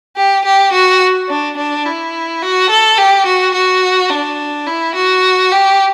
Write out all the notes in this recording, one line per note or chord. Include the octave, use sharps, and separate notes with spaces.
G4
G4
F#4
D4
D4
E4
F#4
A4
G4
F#4
F#4
D4
E4
F#4
G4